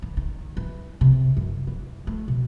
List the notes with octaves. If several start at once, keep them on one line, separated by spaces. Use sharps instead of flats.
E3
D#3
E3
C3
F#2
E3
A3
B2